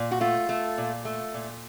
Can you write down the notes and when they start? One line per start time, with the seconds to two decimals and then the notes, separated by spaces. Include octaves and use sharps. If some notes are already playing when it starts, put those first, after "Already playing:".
Already playing: A#2
0.11 F#4
0.21 A3 F4
0.49 A3
0.78 A#2
1.05 A3
1.34 A#2